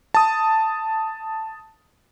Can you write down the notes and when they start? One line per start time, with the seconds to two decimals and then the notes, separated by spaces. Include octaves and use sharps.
0.14 A5 D#6